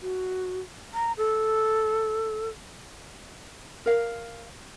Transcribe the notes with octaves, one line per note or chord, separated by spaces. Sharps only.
F#4
A#5
A4
A#4 F5